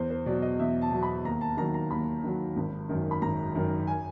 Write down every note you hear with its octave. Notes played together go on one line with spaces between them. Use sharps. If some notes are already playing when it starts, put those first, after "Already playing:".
Already playing: E2 C5
C5
B2 F#3 D5
D#5
E2 E5
A5
B2 F#3
B5
D#2 A#5
A5
D#3 F#3 A#5
A#5
D#2 B5
D#3 F#3
G#1
F#2 D#3
B5
G#1 A#5
F#2 D#3
G#5